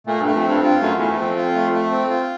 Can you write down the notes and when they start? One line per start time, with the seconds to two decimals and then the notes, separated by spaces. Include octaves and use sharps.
0.07 A#2 A3
0.21 G2 A3
0.34 F2
0.44 G2 C4
0.62 G2 F4
0.80 F#2 A3
0.99 E2 A3
1.11 E2
1.18 F2 C4
1.36 F4
1.55 A3
1.73 A3
1.91 C4
2.10 F4